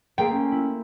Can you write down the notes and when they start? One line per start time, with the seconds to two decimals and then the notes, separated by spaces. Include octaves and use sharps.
0.18 A3 A#3 C4 G#4 G5
0.31 C#4
0.52 E4